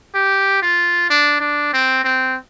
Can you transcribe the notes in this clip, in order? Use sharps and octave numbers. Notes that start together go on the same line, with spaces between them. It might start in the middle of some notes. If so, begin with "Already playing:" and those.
G4
F4
D4
D4
C4
C4